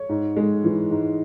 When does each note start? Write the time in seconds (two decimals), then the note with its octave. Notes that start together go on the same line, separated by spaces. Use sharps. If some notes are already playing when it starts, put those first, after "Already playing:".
Already playing: C#5
0.09 G#2
0.37 G#3
0.64 E3
0.91 G#2